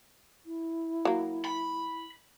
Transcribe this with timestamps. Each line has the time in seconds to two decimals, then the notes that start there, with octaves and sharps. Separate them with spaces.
0.45 E4
1.05 F#3 A#3
1.45 B5